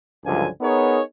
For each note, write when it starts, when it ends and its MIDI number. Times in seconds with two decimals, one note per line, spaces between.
0.25 0.48 37
0.25 0.48 43
0.25 0.48 50
0.25 0.48 53
0.25 0.48 54
0.25 0.48 80
0.61 1.00 59
0.61 1.00 63
0.61 1.00 68
0.61 1.00 70
0.61 1.00 73